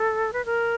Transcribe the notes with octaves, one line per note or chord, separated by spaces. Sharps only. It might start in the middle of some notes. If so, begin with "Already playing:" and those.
Already playing: A4
B4
A#4